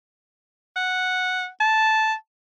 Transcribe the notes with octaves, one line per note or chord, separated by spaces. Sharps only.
F#5
A5